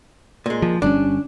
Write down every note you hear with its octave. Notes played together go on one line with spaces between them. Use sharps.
A#2 G#3
F3
G1 G3 C#4 D4